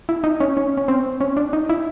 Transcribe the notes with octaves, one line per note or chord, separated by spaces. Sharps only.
E4
D#4
C#4
C#4
C#4
C4
C#4
D4
D#4
E4